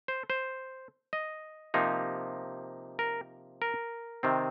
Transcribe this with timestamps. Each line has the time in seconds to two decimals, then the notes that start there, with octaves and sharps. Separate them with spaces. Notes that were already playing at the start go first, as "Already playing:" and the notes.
0.08 C5
0.30 C5
1.13 D#5
1.74 C3 F3 A#3 D#4
2.99 A#4
3.62 A#4
4.23 C3 D#3 C4